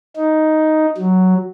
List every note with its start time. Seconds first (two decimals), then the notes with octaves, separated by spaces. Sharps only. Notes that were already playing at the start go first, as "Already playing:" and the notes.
0.16 D#4
0.97 F#3